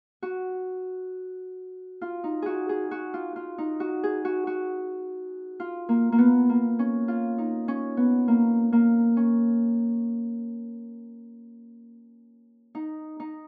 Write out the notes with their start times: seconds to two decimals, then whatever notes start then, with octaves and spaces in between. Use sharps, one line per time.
0.22 F#4
2.01 F4
2.24 D#4
2.42 F#4 G#4
2.69 G#4
2.91 F#4
3.14 F4
3.36 F4
3.58 D#4
3.80 F#4
4.03 G#4
4.25 F#4
4.47 F#4
5.60 F4
5.89 A#3
6.12 A#3
6.18 B3
6.49 A#3
6.79 C#4
7.08 F4
7.38 D#4
7.68 C#4
7.97 B3
8.28 A#3
8.72 A#3
9.17 C#4
12.75 D#4
13.20 D#4